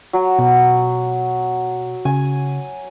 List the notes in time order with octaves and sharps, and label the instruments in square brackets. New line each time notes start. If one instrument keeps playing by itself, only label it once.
[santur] F#3
[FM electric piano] B2 [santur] F#5
[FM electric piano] C#3 [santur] G#5